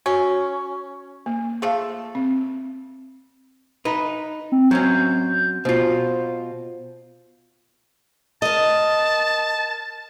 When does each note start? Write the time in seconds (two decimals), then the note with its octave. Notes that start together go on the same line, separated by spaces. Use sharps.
0.06 C#4 F#4
1.26 A#3
1.62 F3 A3 G#4 A4 F5
2.15 C4
3.85 D#4 B4
4.52 C4
4.71 F#3 C4 C#4 G6
5.65 B2 F4 C5
8.42 A#4 D#5 A5